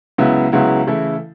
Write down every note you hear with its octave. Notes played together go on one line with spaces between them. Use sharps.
C#2 C#3 F#3 B3 E4
C#2 C#3 F#3 B3 E4
C#3 E3 A3 E4 A4